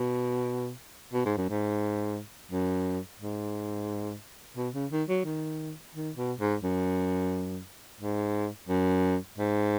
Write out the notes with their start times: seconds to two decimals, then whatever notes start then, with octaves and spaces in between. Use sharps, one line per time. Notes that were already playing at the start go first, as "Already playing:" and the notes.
Already playing: B2
1.13 B2
1.25 G#2
1.37 F#2
1.50 G#2
2.51 F#2
3.19 G#2
4.57 B2
4.74 C#3
4.91 D#3
5.08 F#3
5.25 D#3
5.95 D#3
6.17 B2
6.40 G#2
6.64 F#2
8.00 G#2
8.69 F#2
9.38 G#2